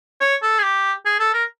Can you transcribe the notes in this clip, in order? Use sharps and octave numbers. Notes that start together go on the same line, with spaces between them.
C#5
A4
G#4
G4
G#4
A4
A#4